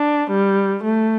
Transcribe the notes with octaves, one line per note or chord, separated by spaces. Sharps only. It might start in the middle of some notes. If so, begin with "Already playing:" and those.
Already playing: D4
G3
A3